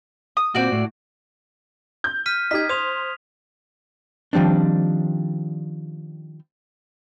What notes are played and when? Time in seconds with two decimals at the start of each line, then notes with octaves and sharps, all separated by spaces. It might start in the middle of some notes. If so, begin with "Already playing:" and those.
0.37 D#6
0.55 A#2 C4 F#4 D5
0.72 A2
2.04 G6
2.26 F6 B6 D#7
2.51 D#4 G4 G#6 B6
2.69 C5 D#6 F7
4.33 D#3 F3 G3 C4 D4